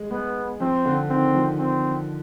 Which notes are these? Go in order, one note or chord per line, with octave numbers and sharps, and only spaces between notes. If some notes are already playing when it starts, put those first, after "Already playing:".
Already playing: G#3
G#3 B3
F3 C4
D3
D#3 C4
F3
C4